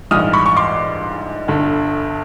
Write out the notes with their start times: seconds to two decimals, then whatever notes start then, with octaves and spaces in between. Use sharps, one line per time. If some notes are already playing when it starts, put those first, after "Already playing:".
0.11 A#1 G#2 E3 G3 D#6 F6
0.33 B5 C#6
0.46 C#6
0.57 C6 D6
1.48 G1 G2 D3